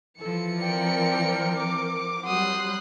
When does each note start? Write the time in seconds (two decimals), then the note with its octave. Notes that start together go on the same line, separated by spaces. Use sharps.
0.20 E3 F3 A4 C#7
0.59 C4 A#4 D5 G5
1.58 D6
2.26 F#3 G3 F#5 C6 D#6 F#6